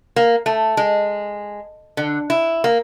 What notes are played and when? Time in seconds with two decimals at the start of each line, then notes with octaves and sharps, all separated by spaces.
0.16 A#3
0.46 A3
0.77 G#3
1.97 D3
2.30 E4
2.64 A#3